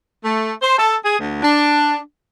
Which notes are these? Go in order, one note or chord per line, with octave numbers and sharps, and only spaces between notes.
A3
C5
A4
G#4
D2
D4